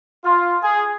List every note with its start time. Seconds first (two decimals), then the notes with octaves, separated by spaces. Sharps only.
0.24 F4
0.62 G#4